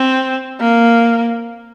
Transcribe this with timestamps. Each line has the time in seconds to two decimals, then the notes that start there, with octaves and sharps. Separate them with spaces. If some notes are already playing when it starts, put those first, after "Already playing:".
Already playing: C4
0.61 A#3